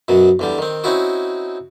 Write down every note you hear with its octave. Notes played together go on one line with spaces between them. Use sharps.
F#2 B2 F#3
E2 D3 G3
D#3 C4
C4 C#4 D#4 E4 F#4